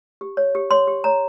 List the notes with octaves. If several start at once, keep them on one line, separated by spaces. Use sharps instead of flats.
G4
C#5
G4
C#5 C6
G4
C#5 A#5